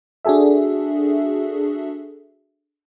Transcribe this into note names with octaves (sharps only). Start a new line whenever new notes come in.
D4 F#4 G#4 A4 E5